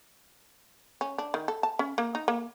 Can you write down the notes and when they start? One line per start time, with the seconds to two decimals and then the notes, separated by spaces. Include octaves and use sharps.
1.01 C#4
1.18 D4
1.34 D#3
1.48 A4
1.63 A5
1.79 C#4
1.98 A#3
2.15 D#4
2.28 A#3